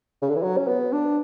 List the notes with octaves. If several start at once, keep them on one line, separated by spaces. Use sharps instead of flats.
C#3
D3
E3
F#3
C#4
B3
D4